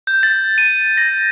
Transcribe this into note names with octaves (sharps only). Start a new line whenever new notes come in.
G6
A6
D#7
A#6